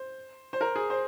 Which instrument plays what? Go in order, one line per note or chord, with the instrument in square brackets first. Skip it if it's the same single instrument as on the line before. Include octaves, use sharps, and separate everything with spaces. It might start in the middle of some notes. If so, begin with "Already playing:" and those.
Already playing: [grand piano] C5
C5
A#4
G#4
C5